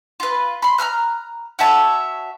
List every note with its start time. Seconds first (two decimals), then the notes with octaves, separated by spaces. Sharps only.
0.20 F4 B4
0.62 B5 C6
0.78 A#5 B5 F6 F#6
1.59 F#4 C#5 E5 A5